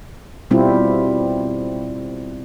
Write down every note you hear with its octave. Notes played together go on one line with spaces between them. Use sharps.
B2 G3 C4 E4 F4